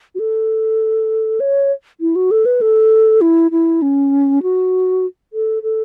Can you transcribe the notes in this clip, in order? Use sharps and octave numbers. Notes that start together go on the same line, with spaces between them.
F#4
A4
C#5
E4
F#4
A4
B4
A4
E4
E4
C#4
F#4
A4
A4